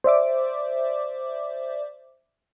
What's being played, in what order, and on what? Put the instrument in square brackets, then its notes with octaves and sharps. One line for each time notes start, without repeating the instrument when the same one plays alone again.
[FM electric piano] C5 D5 E5 D6